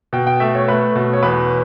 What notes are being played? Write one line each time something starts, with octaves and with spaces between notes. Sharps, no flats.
B2 G5
G5
A3 E5
C#5
A3 B4
B2
C#5
E2 B4